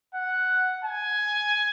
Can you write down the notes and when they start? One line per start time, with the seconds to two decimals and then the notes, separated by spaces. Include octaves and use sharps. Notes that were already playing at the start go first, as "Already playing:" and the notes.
0.15 F#5
0.85 G#5